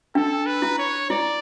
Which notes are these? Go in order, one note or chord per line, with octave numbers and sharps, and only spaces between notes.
D4 A4
B4
E4
C#5
E4 D5